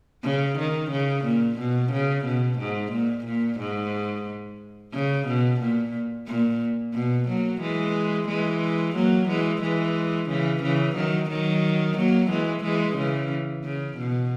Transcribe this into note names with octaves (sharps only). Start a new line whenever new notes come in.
C#3
D#3
C#3
A#2
B2
C#3
B2
G#2
A#2
A#2
G#2
C#3
B2
A#2
A#2
B2
F#3 A#3
E3 G#3
E3 G#3
F#3 A#3
E3 G#3
E3 G#3
C#3 E3
C#3 E3
D#3 F#3
D#3 F#3
F#3 A#3
E3 G#3
E3 G#3
C#3 E3
C#3
B2